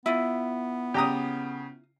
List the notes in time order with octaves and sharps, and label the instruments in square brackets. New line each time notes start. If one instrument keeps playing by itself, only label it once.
[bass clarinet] B3 [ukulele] E4 F4
[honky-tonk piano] C#3 [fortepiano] G4 A#5 D#6